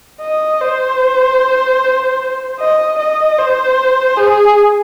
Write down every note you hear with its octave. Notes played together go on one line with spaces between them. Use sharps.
D#5
C5
D#5
D#5
C5
G#4